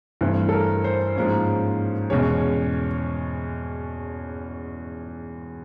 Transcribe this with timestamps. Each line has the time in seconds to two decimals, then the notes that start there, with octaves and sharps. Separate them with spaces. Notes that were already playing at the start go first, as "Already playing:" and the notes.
0.21 G2 E3 A3 C4
0.49 A4
0.52 A#4
0.84 C5
1.15 G#2 F3 A#3 C#4
2.10 E2 B2 G#3 C#4 C#5